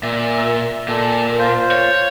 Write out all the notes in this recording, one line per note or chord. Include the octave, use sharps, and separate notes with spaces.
A#2 E5
A#2 A4
F4 C5
C#5